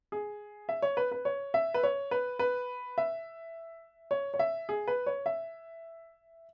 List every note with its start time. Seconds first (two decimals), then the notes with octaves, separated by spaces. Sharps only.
0.12 G#4
0.69 E5
0.82 C#5
0.97 B4
1.12 B4
1.25 C#5
1.54 E5
1.74 B4
1.83 C#5
2.11 B4
2.39 B4
2.98 E5
4.11 C#5
4.34 C#5
4.39 E5
4.69 G#4
4.88 B4
5.06 C#5
5.26 E5